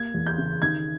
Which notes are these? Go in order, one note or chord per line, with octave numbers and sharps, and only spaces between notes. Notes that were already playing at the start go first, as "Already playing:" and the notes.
Already playing: A#3 G#6
E2
G6
C#3
D#3 G#6